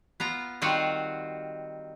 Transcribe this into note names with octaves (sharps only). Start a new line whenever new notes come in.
B3 F4 A#5
D#3 G3 C4 F4 F#4 F#5